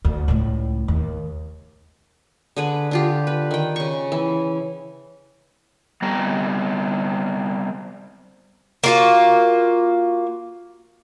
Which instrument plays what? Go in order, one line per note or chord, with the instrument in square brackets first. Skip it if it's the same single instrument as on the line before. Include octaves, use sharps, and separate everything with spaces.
[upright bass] D2
C#2 A2
D#2
[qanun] D3 G#4 B4
D3 F4 G4
B4
D#3 G5
C#3 C#6
E3
[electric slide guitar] G3 B3 C4 A#5
[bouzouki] A#3 F4 F#4